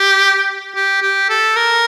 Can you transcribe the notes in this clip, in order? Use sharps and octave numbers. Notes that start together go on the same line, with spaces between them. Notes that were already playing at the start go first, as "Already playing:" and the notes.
Already playing: G4
G4
G4
A4
A#4